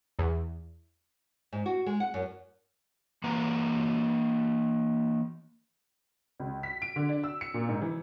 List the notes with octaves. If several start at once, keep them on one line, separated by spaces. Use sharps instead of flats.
E2
G#2
F#4
G#3
F#5
F#2
E3 A#3 B4 F#5 A#5
C#2
B6
D7
D3
D4
E6
C#7
A#2
G#2
E3